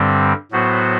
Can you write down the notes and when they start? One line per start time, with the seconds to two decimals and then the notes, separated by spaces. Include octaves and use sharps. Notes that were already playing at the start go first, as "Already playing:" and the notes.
Already playing: G2 D3 G3 C4
0.51 A2 F#3 B3 F#4 C5